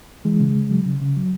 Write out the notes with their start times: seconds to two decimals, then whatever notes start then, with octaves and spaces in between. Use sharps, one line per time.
0.25 E3 G#3
0.40 C#3
0.56 C#3
0.71 F#3
0.86 C#3
1.01 C#3
1.17 F#3